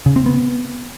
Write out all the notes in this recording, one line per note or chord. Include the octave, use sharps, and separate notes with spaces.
C#3
C4
B3